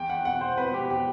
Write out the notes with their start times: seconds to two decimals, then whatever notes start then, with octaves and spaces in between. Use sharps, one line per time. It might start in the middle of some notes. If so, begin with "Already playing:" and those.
Already playing: E2 G5
0.10 F#5
0.25 B2 F#5
0.41 C5
0.57 B2 B4
0.74 G4
0.90 G4